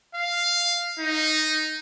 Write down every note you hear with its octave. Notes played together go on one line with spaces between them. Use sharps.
F5
D#4